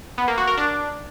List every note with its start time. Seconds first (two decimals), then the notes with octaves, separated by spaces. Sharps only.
0.18 B3
0.28 A#3
0.38 F#4
0.47 A#4
0.57 D4